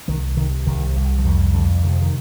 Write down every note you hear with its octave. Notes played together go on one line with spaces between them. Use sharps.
C2 D#3
C3 D#3
C2 D#3
C2
F3
F2 D#3
F2 D3
C3 D#3
F3
D#3